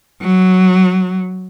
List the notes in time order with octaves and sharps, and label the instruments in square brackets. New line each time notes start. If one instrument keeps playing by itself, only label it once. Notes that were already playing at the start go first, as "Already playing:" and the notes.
[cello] F#3